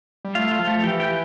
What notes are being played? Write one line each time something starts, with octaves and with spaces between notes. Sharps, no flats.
G3
A3 F4 F5
F4 F5
F3
A3 A4
E3 G4 G5
G4 G5